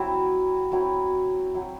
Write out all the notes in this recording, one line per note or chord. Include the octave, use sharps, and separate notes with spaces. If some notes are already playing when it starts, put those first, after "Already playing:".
Already playing: F#3 C4 E4
F#3 C4 E4
F#3 C4 E4